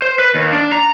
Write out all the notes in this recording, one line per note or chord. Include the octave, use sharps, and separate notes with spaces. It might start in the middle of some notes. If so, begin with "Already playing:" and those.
C5
B4
D#2
D4
A#5